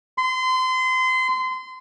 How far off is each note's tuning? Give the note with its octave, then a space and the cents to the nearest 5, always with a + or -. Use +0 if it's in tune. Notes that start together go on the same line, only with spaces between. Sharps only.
C6 -30